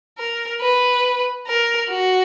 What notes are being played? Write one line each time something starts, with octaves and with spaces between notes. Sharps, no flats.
A#4
B4
A#4
F#4